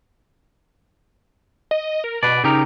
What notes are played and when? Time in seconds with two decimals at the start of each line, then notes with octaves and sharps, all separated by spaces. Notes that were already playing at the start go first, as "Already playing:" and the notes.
1.71 D#5
2.04 A#4
2.23 B2 B4 D5
2.44 C#3 D#4 G4 A#4